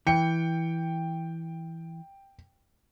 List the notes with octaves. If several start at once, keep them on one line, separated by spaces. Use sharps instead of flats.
E3 G5 C#7